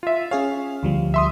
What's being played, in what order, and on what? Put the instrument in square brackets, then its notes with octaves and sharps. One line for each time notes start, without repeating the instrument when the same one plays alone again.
[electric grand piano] F4 E5
[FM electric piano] C#4 G#4 C#5 [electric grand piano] F5
[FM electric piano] D2 F3 G3
[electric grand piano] E5 C6 D#6